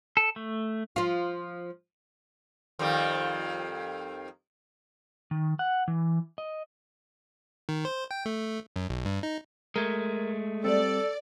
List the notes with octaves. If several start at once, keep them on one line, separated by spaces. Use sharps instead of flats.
A4
A3
F3 F4
F2 D#3 G3
D#3
F#5
E3
D#5
D#3
C5
G5
A3
F#2
B1
G2
D#4
G#3 A3 A#4 G#6
G3 C4 A4 D5